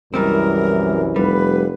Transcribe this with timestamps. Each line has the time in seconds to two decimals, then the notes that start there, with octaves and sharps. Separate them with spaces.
0.14 C2 F#2 E3 G3 G#3 C4 A#4
1.16 F1 G3 B4